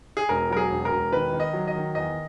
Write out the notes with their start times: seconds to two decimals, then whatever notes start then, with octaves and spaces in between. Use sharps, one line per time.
0.17 G#4
0.29 E1 A#4
0.50 F#3 A#4
0.57 G#4
0.72 E1
0.85 A#4
0.92 E1
1.12 D#3 B4
1.33 D#3
1.40 D#5
1.53 F#3
1.68 D#5
1.75 D#3
1.95 E2 D#5